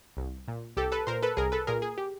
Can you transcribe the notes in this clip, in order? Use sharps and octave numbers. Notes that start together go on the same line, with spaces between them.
C2
A#2
C2 G4 A4
A4 B4
A#2 A#4 C5
A4 B4
C2 G#4 A#4
A4 B4
A#2 G#4 A#4
G#4
G4